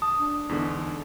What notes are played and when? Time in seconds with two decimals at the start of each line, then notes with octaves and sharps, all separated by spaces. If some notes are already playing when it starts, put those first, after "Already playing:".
0.02 A5 D#6
0.20 D4
0.49 E2 G#2 D3